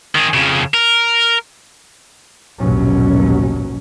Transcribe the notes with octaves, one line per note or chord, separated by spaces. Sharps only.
D#3 G#4
F2 C#3
A#4
A#1 D#2 G#2 B2 F#3 C#4